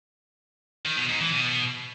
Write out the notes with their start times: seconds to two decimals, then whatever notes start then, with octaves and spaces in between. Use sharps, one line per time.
0.85 D#3
0.97 B2
1.09 G#2
1.21 E3
1.33 B2